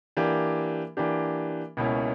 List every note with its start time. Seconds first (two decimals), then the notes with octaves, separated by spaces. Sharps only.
0.17 E3 A#3 D4 G4
0.97 E3 A#3 D4 G4
1.77 C#2 B2 A#3 C#4 E4